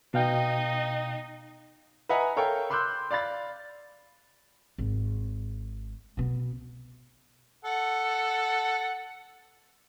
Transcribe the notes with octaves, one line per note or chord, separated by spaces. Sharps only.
B2 D#4 D#5 F5 G5
B4 D#5 E5 F#5 G#5 A#5
A4 A#4 C#5 F5 G5
B5 C6 D6 E6 F#6 G6
D5 F5 B5 A6
G#1
B2 B3
A4 F#5